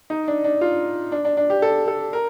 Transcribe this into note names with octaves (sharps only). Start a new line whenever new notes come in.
D#4
D4
D4
F4
D4
D4
D4
G4
A4
A4
A#4